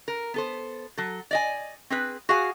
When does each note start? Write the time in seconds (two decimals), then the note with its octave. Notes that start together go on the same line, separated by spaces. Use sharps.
0.08 A#4
0.34 B3 A4 C5
0.97 F#3 A4
1.31 D5 D#5 G#5
1.90 C4 G#4 B4
2.29 F#4 G#4 F5 F#5 G#5